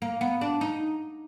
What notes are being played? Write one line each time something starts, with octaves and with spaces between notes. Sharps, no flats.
A#3
B3
D4
D#4